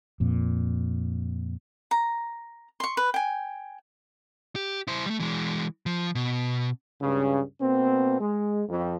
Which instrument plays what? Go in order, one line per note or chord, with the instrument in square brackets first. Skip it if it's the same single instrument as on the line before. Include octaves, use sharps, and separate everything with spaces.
[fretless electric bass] F2 A#2
[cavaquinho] A#5
C6 C#6
B4
G5 G#5
[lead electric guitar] G4
E4 C5
G3 A3
E3 G#3
F3
B2
[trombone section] C#2 G2 C#3
B2 A#3 C4
G#3
F2